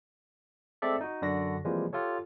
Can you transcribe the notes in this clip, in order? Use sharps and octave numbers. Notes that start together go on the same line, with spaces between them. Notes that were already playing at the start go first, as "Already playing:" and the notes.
G#3 A3 C4 A4 D5 E5
D#4 F#4
F#2 D3 D4 F#4 A#6
C3 E3 F3 G3 G#3 A#3
F4 G4 A4 C#5